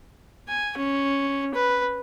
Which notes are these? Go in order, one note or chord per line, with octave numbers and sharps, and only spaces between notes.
G#5
C#4
B4